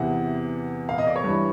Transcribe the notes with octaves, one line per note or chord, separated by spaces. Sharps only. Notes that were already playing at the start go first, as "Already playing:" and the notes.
Already playing: E2 C3 E3 F#5
F5
D#5
D5
C#5
G2
E3